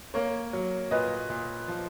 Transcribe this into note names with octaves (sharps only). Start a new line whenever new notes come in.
A#3 A#4 C#5
F#3
A#2 B4 D#5
A#2
F3